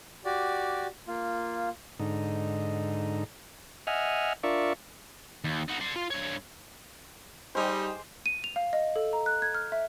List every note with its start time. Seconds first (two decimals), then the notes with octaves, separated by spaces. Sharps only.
0.25 F#4 G4 D5
1.08 A#3 F4
1.99 G#2 D3 D#4
3.87 D#5 E5 F#5 G#5 F6
4.43 D4 F4 A#4 D5 E5 C#6
5.44 D#2
5.68 D#4 F#4
5.80 D5 C6
5.96 F4
6.10 G2 C#5
7.55 G3 G#3 D#4 G4 C5
8.26 D#7
8.44 F7
8.56 F5
8.73 D#5
8.96 A4
9.13 A#5
9.26 F#6
9.42 G#6
9.54 F6
9.72 E5